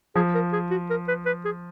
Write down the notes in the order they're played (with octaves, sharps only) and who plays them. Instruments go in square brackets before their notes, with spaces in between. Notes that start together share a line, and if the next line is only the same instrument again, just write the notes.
[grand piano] F3 [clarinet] G#4
[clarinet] A#4
G#4
F#4
A#4
B4
B4
G#4